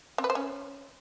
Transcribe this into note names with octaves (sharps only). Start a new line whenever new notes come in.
C4
B4
C5
C#4